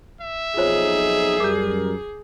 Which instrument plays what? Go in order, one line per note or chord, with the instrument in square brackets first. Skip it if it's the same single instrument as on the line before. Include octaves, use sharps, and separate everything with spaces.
[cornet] E5
[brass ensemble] B1 F2 D#4 [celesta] F4 C5 C#5 [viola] G#4
[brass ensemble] F#2 G3 A#4 [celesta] D6 G6